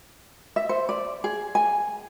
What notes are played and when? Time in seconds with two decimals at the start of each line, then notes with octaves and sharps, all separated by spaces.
0.56 E5
0.69 C5
0.89 D5
1.24 G#4
1.55 G#5